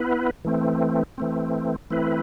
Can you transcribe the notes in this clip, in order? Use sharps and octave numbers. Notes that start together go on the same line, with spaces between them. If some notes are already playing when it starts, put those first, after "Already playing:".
Already playing: B3 E4 B4
E3 A3 C4
E3 A3 C4
E3 A3 C4 E4 B4